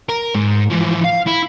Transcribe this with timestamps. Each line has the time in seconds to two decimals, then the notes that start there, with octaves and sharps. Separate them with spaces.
0.09 A#4
0.35 G#2
0.70 E3 F3
1.04 F5
1.27 E4